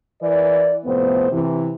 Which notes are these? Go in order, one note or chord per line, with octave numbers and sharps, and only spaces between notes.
E3 A#4 D5
F2 A2 C3 B3 C5
C3 E3